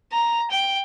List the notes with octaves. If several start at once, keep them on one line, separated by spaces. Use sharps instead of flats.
A#5
G5